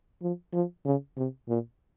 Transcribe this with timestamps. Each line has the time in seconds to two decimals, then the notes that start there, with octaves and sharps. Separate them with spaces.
0.22 F3
0.53 F3
0.85 C#3
1.17 C3
1.48 A#2